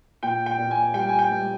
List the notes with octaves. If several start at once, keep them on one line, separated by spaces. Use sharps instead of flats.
A#2 G5
G5
A#2
G#5
G3 G5
G#5
G5
G3